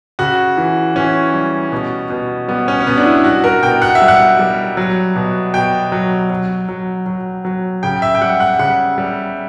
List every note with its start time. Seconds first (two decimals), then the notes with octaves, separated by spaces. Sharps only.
0.19 C#3 F#4
0.57 E3
0.96 E3 C#4
1.34 G3
1.72 B2
2.10 B2
2.48 G3 B3
2.68 C#4
2.80 C#4
2.87 B2 B3
2.97 D4
3.06 E4
3.24 G3 F#4
3.44 A#4
3.63 B2 G5
3.82 F#5
3.95 E5
4.02 G3
4.08 F#5
4.39 G3
4.77 F#3
5.16 B2
5.54 B2 G5
5.92 F#3
6.30 F#3
6.69 F#3
7.06 F#3
7.45 F#3
7.83 C#3 G5
8.02 E5
8.15 G5
8.21 G3 F#5
8.40 F#5
8.59 C#3 F#5
8.98 G3